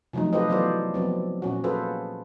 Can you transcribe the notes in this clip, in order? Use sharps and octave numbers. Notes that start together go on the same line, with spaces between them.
C3 F3 F#3 A3 D#4
F4 G4 A4 B4 C5 D#5
E3 F#3 B3 A4 C5 D5
F3 F#3 B3 C4
A#2 C#4 F#4
F4 G#4 A4 B4 C5